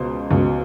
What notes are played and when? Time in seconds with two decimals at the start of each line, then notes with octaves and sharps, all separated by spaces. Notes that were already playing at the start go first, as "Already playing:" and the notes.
Already playing: C#2 B2 C5
0.31 C#2 B2